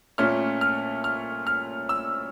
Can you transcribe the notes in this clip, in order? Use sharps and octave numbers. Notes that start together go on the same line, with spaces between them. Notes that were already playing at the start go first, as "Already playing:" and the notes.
A#2 A3 C#4 F6
F6
F6
F6
E6